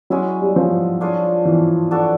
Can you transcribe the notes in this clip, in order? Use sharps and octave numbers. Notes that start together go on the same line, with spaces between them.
F#3 G#3 C#4 E4
G3
F3
D4 F4 G#4 C#5
E3
D4 F#4 A4 C#5